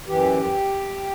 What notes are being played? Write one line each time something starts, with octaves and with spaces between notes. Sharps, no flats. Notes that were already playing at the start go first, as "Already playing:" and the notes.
F#2 E3 G4